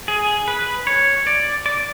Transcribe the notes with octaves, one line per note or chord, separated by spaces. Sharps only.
G#4
B4
C#5
D5
D5